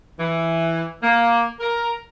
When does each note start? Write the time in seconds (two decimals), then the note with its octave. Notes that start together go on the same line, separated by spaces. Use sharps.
0.20 E3
1.03 A#3
1.60 A#4